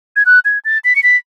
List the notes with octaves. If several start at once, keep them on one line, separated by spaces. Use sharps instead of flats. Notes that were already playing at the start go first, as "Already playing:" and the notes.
G#6
F#6
G#6
A6
B6
C#7
B6